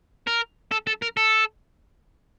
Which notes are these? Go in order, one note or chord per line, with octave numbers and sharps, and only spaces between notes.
A#4
A4
A4
A#4
A4